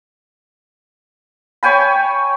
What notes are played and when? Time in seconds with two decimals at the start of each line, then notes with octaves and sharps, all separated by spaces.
1.63 C#5 G5 G#5 B5